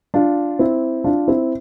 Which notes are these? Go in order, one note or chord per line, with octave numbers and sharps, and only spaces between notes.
D4 F4
C4 E4
D4 F4
C4 E4